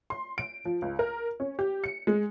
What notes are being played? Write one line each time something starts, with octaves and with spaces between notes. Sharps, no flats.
C6
D7
F3
C#2
A#4
C#4
G4
C#7
G#3